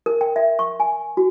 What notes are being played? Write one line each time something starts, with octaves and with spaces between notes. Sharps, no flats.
A#4
G5
E5
C#6
G#5
F#4